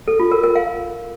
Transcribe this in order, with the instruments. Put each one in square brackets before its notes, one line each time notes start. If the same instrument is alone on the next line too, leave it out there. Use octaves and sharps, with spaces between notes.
[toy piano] A4
F4
A#4
A#4
F5